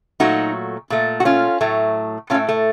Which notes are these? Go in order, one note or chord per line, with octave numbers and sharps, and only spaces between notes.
A#2 F#3 A3 D#4 F#4
A#2 A3
F#4
C#4 F4
A2 F#3 A3
A2 A3 C#4 F4
A3